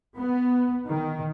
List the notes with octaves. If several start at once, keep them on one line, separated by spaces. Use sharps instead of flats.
B3
D#3